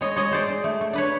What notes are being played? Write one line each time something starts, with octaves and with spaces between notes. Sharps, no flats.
G#3 C#5 D#5
G#3 C#5 D#5
G#3 C5 D5
G#3
A3
A3
D4 B4 C#5